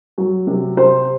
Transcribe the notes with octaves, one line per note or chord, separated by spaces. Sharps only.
F#3
C3
C3 C5